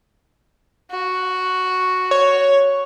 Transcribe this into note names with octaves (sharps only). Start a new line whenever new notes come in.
F#4
C#5